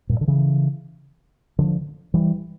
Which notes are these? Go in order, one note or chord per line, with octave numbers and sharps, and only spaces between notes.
G2 A#2
D3
C#3 E3
D3 F3
E3 G3